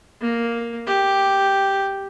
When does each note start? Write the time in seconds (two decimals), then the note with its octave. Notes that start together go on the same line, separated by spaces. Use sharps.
0.21 A#3
0.87 G4